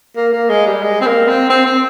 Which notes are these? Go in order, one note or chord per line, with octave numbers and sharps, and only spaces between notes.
A#3
A#3
G#3
G3
G#3
C4
A#3
C4
C4
C4